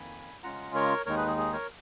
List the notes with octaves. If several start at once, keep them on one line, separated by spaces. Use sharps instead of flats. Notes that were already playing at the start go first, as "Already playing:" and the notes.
Already playing: F2 D#3 A#3 G#5 B5
C#3 G#3 C#4 F4 F#5 A#5
A#4 C#5
D#2 D#3 G#3 D#4 A#4 C#5
G#4 B4
G#4
G#4
A#4 C#5